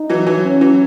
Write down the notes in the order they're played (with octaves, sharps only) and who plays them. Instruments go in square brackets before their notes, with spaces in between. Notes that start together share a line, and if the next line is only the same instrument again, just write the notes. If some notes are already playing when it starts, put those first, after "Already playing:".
Already playing: [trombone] D#4
[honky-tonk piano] E3 F#3
E3 F#3
[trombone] C#4
[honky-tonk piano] E3 F#3